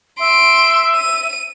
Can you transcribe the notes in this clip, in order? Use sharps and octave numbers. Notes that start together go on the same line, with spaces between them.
E5 C6 D7
D#7